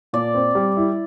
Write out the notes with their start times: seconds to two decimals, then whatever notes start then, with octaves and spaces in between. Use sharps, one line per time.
0.13 A#2 D5
0.34 C4
0.55 G3
0.77 E4